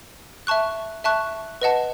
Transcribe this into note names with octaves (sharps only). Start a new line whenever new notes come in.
E5 A5 C#6 F#6
E5 A5 C#6 F#6
B4 D#5 F#5 A5